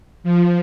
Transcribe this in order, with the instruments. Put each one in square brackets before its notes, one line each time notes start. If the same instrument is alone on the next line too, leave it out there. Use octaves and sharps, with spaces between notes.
[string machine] F3